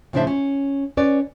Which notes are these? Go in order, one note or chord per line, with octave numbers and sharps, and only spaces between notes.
A2 C#3 F3 D4 C5 E5
C#4
C#4 B4 C#5 D5